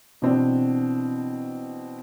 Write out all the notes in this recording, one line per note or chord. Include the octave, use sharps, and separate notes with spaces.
B2 E3 C4 D4